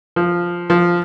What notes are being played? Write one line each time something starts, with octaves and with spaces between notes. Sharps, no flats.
F3
F3